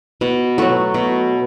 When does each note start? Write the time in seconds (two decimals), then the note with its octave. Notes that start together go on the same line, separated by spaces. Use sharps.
0.21 B2
0.58 F#3 A3 F#4
0.94 B2